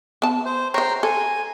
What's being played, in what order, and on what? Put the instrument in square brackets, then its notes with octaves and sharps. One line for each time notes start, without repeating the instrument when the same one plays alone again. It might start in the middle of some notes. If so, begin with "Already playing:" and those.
[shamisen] B3 A5
[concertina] C5
[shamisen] C5 C#5 [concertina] G5 A#5 C6
[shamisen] A4 [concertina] G#5